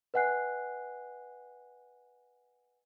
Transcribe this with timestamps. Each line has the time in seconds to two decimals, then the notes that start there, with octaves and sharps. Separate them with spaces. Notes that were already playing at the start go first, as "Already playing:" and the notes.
0.14 B4 D#5 F#5 G#5 F#6 C7